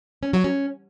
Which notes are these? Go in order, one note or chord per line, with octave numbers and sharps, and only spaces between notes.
C#4
F#3
C#4